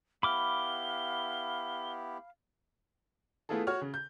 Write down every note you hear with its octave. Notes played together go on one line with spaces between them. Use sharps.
B3 E4 G4 F5 B5 D6 F6 G7
A3 B3 E4 F4 G#4 A4
F#4 C#5 C#6 F6
C#3
G6